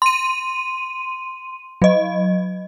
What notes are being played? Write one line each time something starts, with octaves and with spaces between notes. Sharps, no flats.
C6 D#7
F#3 D#5